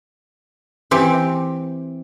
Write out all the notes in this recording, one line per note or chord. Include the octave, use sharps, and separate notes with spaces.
E3 C4 G4